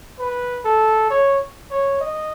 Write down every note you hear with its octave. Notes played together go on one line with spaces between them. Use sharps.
B4
A4
C#5
C#5
D#5